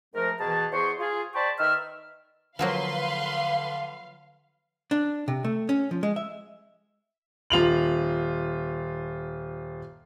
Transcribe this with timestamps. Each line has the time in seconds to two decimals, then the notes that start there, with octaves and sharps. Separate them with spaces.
0.14 G#2 F3 A3 A#4
0.40 B2 E3 G#4 A5
0.72 E2 G#4 C5 C6 C#6
0.99 F4 G#4
1.34 C5 D5 G5 A5 B5 C#6
1.59 D#3 B4 D#5 E5 E6 F6
2.59 D3 F3 F#3 A#3 B4 F5 C6
4.91 D4
5.28 C3
5.44 A3
5.69 C#4
5.91 F3
6.03 G#3
6.16 E5
7.50 D#1 F4 F7 F#7